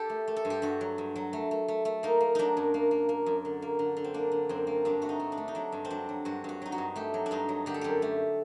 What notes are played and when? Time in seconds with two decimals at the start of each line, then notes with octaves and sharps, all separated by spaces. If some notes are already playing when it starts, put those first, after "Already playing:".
Already playing: G4 A4
0.10 A3
0.28 A3
0.36 A4
0.45 G2
0.50 G4
0.62 G2 F#4
0.81 F#3
0.98 G2
1.16 F#3
1.33 A3
1.51 A3
1.68 A3
1.85 A3
2.03 A#3 D#4
2.21 A#3
2.35 F#3 D4 D#4
2.57 F#2
2.74 A#3
2.91 A#3
3.09 A#3
3.26 F#2
3.45 D3
3.62 A#3
3.79 D3
3.97 D3
4.04 C4
4.14 A#3 D4
4.32 D3
4.49 F#2 C4
4.67 A#3
4.85 G2 D4
5.02 A3 F#4
5.09 D#4
5.20 A3
5.32 D4
5.37 A3
5.48 D#4
5.55 F#3 D4
5.72 G2
5.85 C4
5.91 F#3 D4
6.09 F#3
6.25 G2 F#4
6.44 G2 F#4
6.62 F#3 D#4
6.72 F#4
6.78 G2
6.96 A3 G4
7.14 F#3
7.26 D4
7.31 G2 D#4
7.49 F#3
7.66 D3 G4
7.74 A4
7.81 F#2 G4
8.02 A3